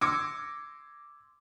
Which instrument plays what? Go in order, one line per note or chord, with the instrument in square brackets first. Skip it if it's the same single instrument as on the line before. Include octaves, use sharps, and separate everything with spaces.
[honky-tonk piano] C6 D6 E6 G#6 A#6 C#7